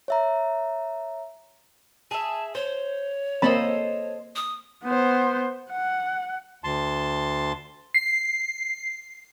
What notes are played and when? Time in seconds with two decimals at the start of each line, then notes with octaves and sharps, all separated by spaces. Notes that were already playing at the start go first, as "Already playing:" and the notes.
0.08 C#5 E5 A#5
2.11 G#4 E5 A5
2.55 C5 C#5
3.42 A#3 C4 A4 C5 D#5 B5
4.36 D#6
4.84 B3 C5
5.71 F#5
6.64 D2 A5 C6
7.94 C7